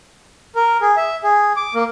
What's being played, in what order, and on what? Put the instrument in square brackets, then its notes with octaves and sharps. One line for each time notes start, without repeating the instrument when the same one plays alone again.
[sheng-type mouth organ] A#4
G#4
E5
G#4
D6
A#3